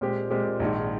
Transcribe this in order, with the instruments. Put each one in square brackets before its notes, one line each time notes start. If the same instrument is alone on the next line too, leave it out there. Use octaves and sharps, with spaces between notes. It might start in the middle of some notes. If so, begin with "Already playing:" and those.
[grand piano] A#2 G#3 C4 G4
A#2 G#3 C4 G4
A#1 G#2 D#3